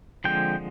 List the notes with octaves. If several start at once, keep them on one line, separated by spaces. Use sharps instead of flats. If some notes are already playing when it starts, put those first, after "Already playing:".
D3 F3 G#3 C4 G5